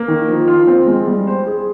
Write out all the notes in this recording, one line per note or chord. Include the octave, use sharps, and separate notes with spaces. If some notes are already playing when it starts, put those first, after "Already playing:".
Already playing: A#3
D#3
F3
F4
C4
G#3
G3
C5
G#4